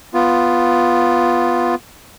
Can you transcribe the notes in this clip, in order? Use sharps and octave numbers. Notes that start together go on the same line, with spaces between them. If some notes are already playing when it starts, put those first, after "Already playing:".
B3 F4